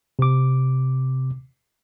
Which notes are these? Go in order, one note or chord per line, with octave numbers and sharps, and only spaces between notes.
C3 D6